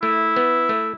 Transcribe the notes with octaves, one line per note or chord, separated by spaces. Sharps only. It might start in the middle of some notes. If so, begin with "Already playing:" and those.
A3 E4
B3
A3